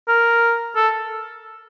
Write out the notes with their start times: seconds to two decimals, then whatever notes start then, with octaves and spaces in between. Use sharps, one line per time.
0.08 A#4
0.76 A4